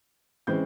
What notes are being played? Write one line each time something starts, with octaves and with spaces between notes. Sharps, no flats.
C#3 E3 G#3 C4 G6